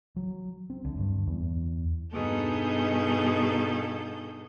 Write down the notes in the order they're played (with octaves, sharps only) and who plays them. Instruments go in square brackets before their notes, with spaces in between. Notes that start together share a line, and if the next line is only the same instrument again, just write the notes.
[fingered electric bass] F#3
C4
D2
G2
E2
[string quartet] G2 B2 D#4 G#4 A4 G6